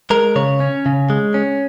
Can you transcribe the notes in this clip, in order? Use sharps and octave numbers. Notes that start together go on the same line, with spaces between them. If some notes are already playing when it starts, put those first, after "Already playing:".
G#3 A#4
C#3 C#5
C#4
C#3
G#3
C#4